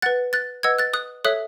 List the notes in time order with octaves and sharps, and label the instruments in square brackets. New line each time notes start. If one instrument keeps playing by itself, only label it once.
[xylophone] B4 F#5 F#6 A6
F#6 A6
B4 D#5 F#5 E6 G#6
F#6 A6
D#6 F#6
A4 C#5 E5 D#6 F#6